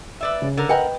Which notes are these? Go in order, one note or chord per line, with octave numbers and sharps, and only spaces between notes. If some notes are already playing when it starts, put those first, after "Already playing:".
B4 D5 E5
C#3
D3 A#4
A#4 B4 D#5 F#5 G5